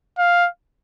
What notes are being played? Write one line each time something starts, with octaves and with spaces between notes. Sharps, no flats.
F5